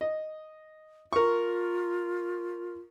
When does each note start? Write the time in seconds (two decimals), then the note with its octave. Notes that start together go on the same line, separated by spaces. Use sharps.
0.01 D#5
1.13 F4 A#4 C#6